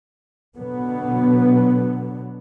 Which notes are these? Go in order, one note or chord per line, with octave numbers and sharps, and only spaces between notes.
B2 D3 F#3 B3